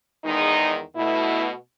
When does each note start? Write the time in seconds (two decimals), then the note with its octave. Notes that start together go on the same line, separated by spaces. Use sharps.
0.25 E2 D#3 G#3 D#4
0.96 B2 A3 E4